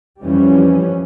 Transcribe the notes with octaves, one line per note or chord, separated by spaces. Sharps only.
F2 E3 F3 G3 C#4